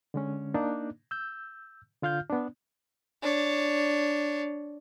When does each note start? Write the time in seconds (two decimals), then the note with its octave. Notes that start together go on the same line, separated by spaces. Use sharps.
0.14 D3 G#3 C#4
0.54 A#3 D4 D#4
1.11 E6 G6
2.03 D3 F4 F5 F6 G6
2.30 B3 D4
3.22 D4 C#5